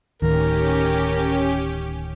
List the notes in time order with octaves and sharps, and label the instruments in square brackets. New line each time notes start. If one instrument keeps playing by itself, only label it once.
[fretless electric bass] D1 [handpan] D#3 [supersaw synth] C#4 G4 [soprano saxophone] A#4